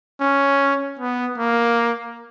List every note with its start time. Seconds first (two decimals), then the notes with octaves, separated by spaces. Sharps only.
0.21 C#4
0.99 B3
1.38 A#3